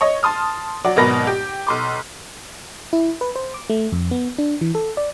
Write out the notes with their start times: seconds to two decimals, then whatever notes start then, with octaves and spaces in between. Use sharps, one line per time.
0.01 C#5 D#5
0.23 A5 C6 D#6 F6
0.84 F#3 F#4 D5
0.96 G#1 B2 F#3 A#4 B4 A#6
1.27 G4
1.67 B1 C6 D6
2.93 E4
3.21 B4
3.36 C5
3.54 D6
3.70 A3
3.92 F2
4.11 B3
4.38 D4
4.61 E3
4.75 A4
4.97 D5